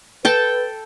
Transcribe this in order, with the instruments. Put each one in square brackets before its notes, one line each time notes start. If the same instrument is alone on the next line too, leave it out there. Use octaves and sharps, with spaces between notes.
[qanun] A4 G5 A5 [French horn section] B4